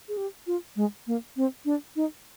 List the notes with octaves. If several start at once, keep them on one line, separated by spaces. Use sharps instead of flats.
G#4
G4
F4
G#3
A#3
C4
D4
D#4